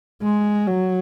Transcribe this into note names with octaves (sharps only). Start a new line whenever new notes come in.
G#3
F#3